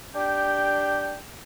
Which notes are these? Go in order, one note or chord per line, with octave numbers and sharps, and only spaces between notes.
D4 G4 G5